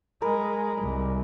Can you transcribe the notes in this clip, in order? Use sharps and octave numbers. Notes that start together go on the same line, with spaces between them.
G#3 A#4 B4
C2